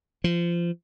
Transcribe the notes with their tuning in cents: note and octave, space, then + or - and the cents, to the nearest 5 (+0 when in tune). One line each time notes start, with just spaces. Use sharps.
F3 -25